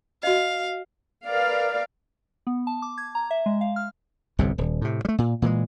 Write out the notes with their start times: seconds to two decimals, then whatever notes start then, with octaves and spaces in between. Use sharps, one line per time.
0.23 F#4 D#5 F5
1.26 A#4 B4 D5 F5
2.47 B3
2.67 A5
2.82 D6
2.98 G#6
3.15 A#5
3.31 E5
3.46 G#3
3.61 F5
3.76 F6
4.39 G1 C2 F2 C3
4.58 D#1
4.81 A2 C3
5.05 G3 A3
5.18 A#2
5.42 A#2 E3 F#3 G#3